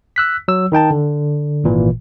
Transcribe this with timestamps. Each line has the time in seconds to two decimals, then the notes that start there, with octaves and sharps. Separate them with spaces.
0.16 E6 F#6 B6
0.48 F#3 E6
0.72 D#3 D#4 G5 A5
0.91 D3
1.64 G#1 A#2 E3